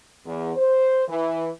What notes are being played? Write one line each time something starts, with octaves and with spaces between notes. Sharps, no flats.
E2
C5
E3